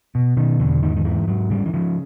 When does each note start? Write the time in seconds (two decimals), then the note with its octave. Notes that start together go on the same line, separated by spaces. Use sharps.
0.15 B2
0.37 B2 D#3
0.59 E2 D3
0.82 G#2 D#3
0.96 D#3
1.05 G#2 E3
1.28 G#2 F#3
1.50 C#3 G3
1.66 E3
1.73 C#3 F3